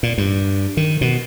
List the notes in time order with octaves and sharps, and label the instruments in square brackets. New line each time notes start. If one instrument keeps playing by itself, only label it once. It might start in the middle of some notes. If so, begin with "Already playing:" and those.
[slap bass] A#2
G2
D#3
B2